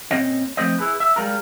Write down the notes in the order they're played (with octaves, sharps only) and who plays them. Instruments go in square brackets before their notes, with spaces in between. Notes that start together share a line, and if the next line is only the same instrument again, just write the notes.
[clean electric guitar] A#2 C4 C#4 D#5
F3 A3 C4 C5 D#5
E4 G#4 B4
E5
G3 G#3 F4 A#4